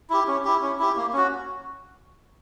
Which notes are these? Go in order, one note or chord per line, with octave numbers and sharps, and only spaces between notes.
E4 G4
C#4
E4 G4
C#4
E4 G4
A#3
C#4 F#4